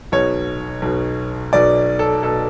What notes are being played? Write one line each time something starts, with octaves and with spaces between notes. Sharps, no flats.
B1 B2 C#5
B1 B2
B1 B2 D5
A4
B2 A4